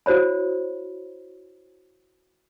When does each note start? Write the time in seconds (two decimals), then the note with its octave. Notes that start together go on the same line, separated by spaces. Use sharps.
0.06 E4 F#4 C5 C#5 B5